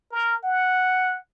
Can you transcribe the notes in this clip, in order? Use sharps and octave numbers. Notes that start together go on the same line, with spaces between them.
A#4
F#5